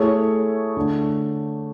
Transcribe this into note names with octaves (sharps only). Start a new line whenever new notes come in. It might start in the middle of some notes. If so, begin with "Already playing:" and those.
Already playing: A3 E4 G#4 C#5
D3 A3 D4